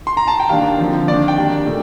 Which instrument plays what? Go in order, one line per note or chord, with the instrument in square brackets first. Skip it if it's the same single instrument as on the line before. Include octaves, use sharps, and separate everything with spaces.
[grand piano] C6
A#5
A5
G5
D#3 G3 A#3 D4 F5
D3 F3 C4
D#3 A#3 D4 D5
G5
D#3 G3 A#3 D4
A#2 A3 D4